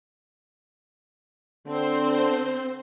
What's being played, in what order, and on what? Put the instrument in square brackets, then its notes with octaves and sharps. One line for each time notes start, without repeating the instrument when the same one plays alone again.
[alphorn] D3 [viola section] C4 C5